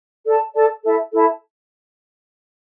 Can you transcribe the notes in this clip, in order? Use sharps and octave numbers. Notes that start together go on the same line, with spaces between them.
A4 D5 A5
A4 D5 A5
E4 A4 E5 A5
E4 A4 E5 A5